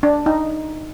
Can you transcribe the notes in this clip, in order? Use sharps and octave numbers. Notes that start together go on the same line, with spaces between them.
D4
D#4